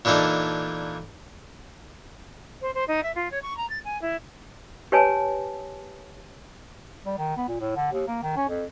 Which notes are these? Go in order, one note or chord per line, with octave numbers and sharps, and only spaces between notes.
A#2 E3 D4 D#4 A4
C5
C5
D#4
E5
F4
C#5
C#6
A#5
A6
G#5
E4
G4 B4 C#5 G#5 A5
G3
D#3
B3
A#2
A2
D3
D#2
A#3
D#3
C#4
F2